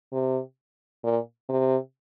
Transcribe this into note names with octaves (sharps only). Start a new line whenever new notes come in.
C3
A#2
C3